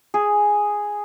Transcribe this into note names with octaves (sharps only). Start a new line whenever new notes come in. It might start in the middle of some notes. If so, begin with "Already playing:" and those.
G#4